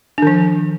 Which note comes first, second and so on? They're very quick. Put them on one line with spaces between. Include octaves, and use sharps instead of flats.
D4 D#3 F3